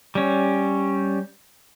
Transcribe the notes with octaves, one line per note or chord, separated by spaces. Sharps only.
G3 C#4